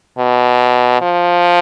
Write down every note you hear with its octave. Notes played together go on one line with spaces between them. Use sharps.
B2
F3